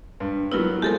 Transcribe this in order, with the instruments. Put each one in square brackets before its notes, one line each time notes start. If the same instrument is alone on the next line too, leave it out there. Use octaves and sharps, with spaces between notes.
[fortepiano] G2
[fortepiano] F#3 B3 [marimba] E4 F4 A#4
[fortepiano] F3 G#3 [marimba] G4 A4 A#4